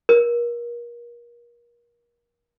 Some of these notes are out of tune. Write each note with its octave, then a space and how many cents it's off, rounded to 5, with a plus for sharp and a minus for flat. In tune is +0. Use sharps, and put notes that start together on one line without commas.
A#4 +30